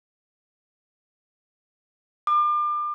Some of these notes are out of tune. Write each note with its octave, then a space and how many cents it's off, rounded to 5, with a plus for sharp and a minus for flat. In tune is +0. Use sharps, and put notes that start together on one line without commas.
D6 +35